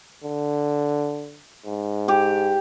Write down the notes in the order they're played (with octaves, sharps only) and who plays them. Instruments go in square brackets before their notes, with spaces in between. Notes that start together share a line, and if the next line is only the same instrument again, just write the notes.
[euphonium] D3
G#2
[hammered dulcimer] G4